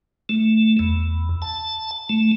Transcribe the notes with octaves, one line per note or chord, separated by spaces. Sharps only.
A3
E2
A5
A3